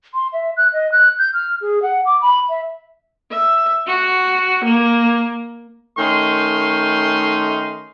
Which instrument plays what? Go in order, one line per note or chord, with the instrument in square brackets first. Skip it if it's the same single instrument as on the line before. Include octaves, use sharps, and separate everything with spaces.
[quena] C6
E5
F#6
D#5
F#6
G6
F6
G#4
F#5
D6
B5
E5
[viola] E5
F#4
A#3
[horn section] D#3 A3 C#4 D#4 C6